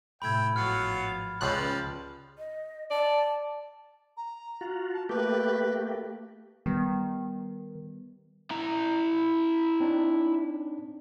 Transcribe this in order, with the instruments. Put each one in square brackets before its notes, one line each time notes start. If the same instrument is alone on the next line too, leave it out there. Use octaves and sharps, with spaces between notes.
[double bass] A2 C3 [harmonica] E5 G5 [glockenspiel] B5 G#6
[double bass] G#1 F3 [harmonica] F#3 B3 F5 [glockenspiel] F6 A6
[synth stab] C#2 F#6 [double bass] C#3 [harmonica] F3 G3 F5
[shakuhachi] D#5
[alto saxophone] D5 [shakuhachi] A5
[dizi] A#5
[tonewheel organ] F4 F#4
[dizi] A5
[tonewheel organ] A3 A#3 G4 [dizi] B4
[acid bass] D#3 [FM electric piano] G3 B3
[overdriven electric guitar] E4 A#5
[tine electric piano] C4 D4 D#4